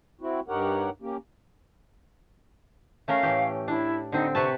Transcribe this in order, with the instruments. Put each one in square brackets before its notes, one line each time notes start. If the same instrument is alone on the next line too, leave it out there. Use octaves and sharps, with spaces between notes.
[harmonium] C4 E4 F#4
G2 D#4 G4 A#4 C#5 F#5
A#3 C#4 G4
[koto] A3 C#4 A#4 [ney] F5
[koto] A2 E3 G4
[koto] D4 [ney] E4
[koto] D3 C4 [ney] D#4
[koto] C3 B4 A5 [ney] C#6